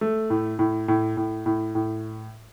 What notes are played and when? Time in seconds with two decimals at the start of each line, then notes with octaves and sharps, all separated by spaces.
0.01 A3
0.30 A2
0.59 A2
0.88 A2
1.17 A2
1.46 A2
1.75 A2